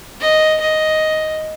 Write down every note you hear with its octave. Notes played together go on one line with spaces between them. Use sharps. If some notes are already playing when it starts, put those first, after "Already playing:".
D#5
D#5